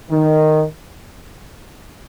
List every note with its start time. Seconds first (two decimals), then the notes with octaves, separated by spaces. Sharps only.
0.10 D#3